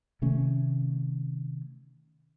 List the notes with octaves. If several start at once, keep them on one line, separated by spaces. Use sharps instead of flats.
C3 D#3 A3 C#4